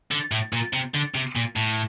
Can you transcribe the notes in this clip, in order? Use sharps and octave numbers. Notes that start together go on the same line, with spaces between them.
D3
A2
A#2
C3
D3
C3
A#2
A2